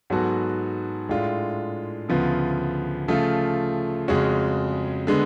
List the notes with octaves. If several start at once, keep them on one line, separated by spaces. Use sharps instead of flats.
G#2 F#3 B3 F#4 A4
A2 G#3 D4 F4
D2 C#3 F3 B3 F4
C#3 F3 A3 F4
F2 C#3 G#3 C#4 F#4
D3 G#3 B3